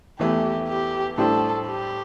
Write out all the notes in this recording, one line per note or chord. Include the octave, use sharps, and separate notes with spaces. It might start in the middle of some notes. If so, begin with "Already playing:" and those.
E2 E3 A3 E4 G4
G4
A2 G3 D4 G4 A4 C5
G4